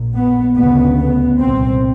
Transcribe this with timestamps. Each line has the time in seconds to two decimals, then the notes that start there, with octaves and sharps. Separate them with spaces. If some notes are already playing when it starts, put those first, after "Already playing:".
Already playing: A#1 A#2
0.16 B3
0.57 D2 C#3 B3
0.99 B3
1.40 C2 A#2 C4